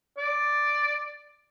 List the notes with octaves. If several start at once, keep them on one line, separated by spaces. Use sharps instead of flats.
D5